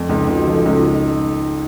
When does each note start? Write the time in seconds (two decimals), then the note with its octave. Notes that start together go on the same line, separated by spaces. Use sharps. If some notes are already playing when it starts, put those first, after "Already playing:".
Already playing: F2
0.08 C#2 D#4
0.22 F4
0.28 C#2
0.34 F#4
0.47 F3 A4
0.56 F4
0.65 C#2 C#4
0.76 D#4